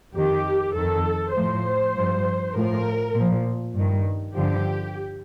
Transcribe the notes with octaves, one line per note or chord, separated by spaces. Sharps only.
F2 D#3 G4
F2 D#3 A4
A2 F3 C5
G2 F3
A2 F3 A#4
A#2 F3
G2 D#3
G2 D3 F3 G4